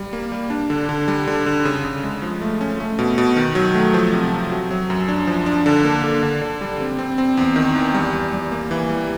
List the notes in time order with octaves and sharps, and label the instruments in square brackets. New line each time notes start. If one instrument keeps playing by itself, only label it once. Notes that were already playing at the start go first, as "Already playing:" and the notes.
Already playing: [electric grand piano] G3
A#3
G3
D4
D3
D3
G3
D3
D3
C#3
C#3
G#3
F3
A3
C#4
A3
B2
B2
D#3
F#3
A3
F3
C3
C3
F#3
F#3
F#2
D4
F3
D4
D3
A#3
D3
D3
D3
G3
C4
C4
C4
E2
D#3
E2
G3
G3
G3
A#3
E3
G3